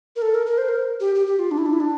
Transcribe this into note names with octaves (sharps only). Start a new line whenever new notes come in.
A#4
A4
A#4
A#4
C5
A#4
G4
G4
G4
F4
D4
E4
D4
E4
D4